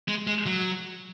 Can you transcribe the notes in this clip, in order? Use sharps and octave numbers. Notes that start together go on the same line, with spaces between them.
G#3
G#3
F#3